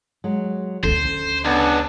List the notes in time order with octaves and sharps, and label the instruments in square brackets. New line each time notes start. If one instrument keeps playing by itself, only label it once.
[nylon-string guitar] F#3 G#3
[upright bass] D2 C#4 [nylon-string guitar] A4 [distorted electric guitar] C5
[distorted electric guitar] C#2 [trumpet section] B3 D4